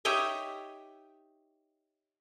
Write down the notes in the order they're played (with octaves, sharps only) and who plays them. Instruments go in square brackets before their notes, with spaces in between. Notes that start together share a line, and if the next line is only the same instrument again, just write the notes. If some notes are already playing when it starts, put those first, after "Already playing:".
[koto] D#4 G4 C#5 D#5 E5